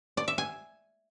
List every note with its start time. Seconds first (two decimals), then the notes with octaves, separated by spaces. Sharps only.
0.17 D5
0.28 E5
0.38 G#5